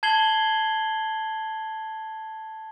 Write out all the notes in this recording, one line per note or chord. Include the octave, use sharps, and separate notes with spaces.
A5 G#6 C7 F#7 G7